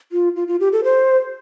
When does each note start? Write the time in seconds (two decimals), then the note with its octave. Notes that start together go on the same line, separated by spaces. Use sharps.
0.12 F4
0.36 F4
0.48 F4
0.60 G4
0.72 A4
0.84 C5